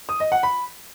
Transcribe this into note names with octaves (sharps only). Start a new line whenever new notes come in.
D#6
D#5
F#5
B5